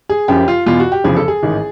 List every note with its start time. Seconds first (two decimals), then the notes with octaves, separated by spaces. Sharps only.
0.09 G#4
0.28 F#1 F#2 C#3 F3 G4
0.48 F4
0.66 E2 B2 F4
0.80 F#4
0.92 G4
1.04 F1 E2 C#3 F3 G#4
1.16 A4
1.28 G#4
1.43 A1 G#2 D#3